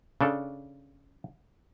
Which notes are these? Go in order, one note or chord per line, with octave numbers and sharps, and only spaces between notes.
C#3 D4 A4